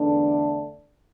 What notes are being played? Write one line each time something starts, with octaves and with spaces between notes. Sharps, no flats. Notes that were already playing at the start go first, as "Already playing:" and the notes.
Already playing: E2 D3 A3 D4